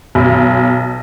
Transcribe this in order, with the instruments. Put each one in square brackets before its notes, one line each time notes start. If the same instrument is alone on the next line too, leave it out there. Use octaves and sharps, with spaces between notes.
[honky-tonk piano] B1